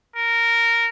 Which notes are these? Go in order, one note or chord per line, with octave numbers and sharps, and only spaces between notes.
A#4